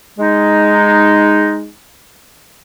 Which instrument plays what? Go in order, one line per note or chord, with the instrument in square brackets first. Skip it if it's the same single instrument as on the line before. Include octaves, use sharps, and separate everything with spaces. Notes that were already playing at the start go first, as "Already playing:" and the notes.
[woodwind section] G#3 D#4